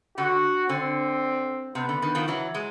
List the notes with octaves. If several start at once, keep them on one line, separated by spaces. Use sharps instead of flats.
D3 F#4
D3 C4
C3 B3
D3
D#3
D#3 F3
E3 F#3
F#3 G#3